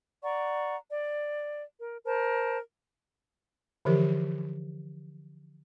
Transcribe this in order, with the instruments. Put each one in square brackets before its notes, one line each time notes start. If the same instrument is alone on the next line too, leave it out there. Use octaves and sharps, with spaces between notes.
[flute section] D5 F#5 A#5 C#6
D5
A#4
A#4 C5 A5
[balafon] D3 E3 F3 G4 A#4